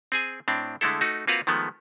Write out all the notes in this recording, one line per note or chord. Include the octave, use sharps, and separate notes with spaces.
C4 G#4 G#5
A2 C4 D4
D3 G#3 A3 E4 A4
A3 D#4 F#4
A#3 C4 F4 F#4 B4 F5
D#3 F3 G#3 A3 B3